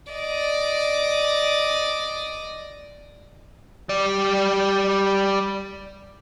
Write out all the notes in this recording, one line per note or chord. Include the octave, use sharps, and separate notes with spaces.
D5 D#5
G3 D5